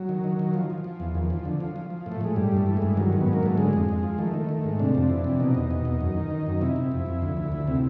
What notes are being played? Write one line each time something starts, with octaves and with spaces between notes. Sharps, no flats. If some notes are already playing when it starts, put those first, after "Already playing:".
Already playing: F#3
D#3
D#3
D#3
F3
F3
F3
E2
D#2
F3
D3
F3
F3
F3
A2
A3
A2 G#3
G2 G3
G2 A3
E3
G#3
G2
D#3 F#3
G#2
B3
G#2
A#3
G#2 A3
D3 G#3
F2
F2
F3
D#3 A3
D#3
D#3
G#2
C3 D4
F2
E3
C3
B2 D#4
E2
B2
E2
F#2
D#3
D#3
F#2
C3 E4
C3
F2
F2
D2
D2
D2
C3